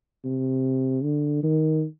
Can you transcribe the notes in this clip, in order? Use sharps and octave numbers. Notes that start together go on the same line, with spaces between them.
C3
D3
D#3